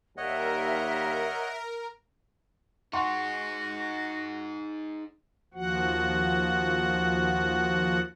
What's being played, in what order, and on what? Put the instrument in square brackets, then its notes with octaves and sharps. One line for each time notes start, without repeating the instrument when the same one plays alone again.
[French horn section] D#2 G3 [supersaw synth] A#4 [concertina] C#5 D#5 F#5 [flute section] E5
[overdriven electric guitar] D#4 G#4 [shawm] F#4 [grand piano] F#5 C6 C#6
[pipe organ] D#2 F3 F#4 F#5